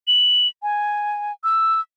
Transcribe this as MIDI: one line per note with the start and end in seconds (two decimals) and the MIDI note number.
0.07 0.47 102
0.63 1.32 80
1.44 1.80 88